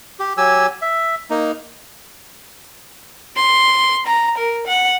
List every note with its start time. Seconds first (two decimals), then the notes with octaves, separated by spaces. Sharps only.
0.19 G4
0.37 F#3 G4 G#5 E6
0.82 E5
1.30 A#3 D#4
3.36 C6
4.06 A#5
4.37 A#4
4.67 F#5